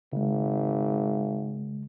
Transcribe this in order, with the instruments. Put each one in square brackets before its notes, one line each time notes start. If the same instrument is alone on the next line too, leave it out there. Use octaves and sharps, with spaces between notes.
[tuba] G#1 [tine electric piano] C#3 G#3